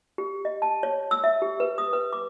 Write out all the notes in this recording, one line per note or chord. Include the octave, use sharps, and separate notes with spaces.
G4
D#5
A5
C#5
E6
E5
G4
B4
D#6
B4
D6